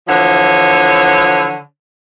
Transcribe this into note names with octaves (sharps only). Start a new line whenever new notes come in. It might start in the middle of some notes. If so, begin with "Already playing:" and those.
D3 E3 F3 C#5